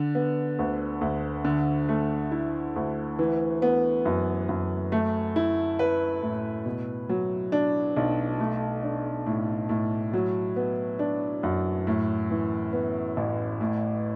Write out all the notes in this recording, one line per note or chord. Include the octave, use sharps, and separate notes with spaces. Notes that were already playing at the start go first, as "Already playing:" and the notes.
Already playing: D3
B3
D2
D2
D3
A3
E4
D2
E3
B3
F#2
F#2
A3
E4
B4
A2
B2
F#3
D4
B1
A3
D4
A2
A2
F#3
B3
D4
F#2
A2
E3
B3
A1
A2